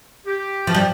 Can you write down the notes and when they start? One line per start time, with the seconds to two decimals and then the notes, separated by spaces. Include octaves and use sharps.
0.26 G4
0.67 F3
0.75 G3